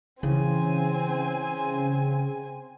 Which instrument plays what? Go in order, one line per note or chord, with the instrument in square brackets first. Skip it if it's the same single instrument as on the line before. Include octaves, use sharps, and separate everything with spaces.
[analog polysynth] C#3 [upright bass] E3 [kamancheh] C4 G#5